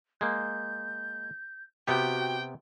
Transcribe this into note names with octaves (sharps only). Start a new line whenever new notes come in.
G#3 A#3 G6
C3 B3 F#4 G4 G5